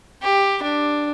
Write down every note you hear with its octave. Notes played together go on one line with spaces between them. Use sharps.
G4
D4